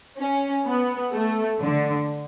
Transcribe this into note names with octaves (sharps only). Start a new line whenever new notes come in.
C#4
B3
A3
D3